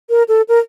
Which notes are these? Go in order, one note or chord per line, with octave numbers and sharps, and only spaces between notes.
A#4
A4
A#4